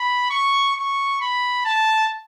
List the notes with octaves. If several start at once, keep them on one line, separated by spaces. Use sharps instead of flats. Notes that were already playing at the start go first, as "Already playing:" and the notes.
Already playing: B5
C#6
C#6
B5
A5